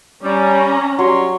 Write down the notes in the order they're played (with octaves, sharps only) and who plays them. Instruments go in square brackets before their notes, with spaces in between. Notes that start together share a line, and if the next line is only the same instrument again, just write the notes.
[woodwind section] G3 [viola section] C#4 A#5
[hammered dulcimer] F#3 [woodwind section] G3 C#5 C6